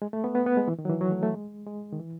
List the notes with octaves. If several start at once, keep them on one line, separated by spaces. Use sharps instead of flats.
G#3
A3
B3
B3
B3
G#3
E3
D#3
F#3
E3
F#3
A3
A3
G#3
G#3
D#3
E3